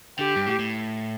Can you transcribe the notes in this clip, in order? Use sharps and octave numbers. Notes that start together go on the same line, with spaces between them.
D3 G4
G2
A2
A2